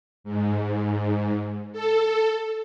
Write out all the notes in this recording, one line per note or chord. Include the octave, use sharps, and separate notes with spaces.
G#2
A4